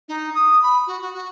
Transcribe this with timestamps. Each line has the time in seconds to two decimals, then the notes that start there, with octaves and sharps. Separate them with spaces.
0.08 D#4
0.34 D#6
0.63 B5
0.87 F#4
1.02 F#4
1.14 F#4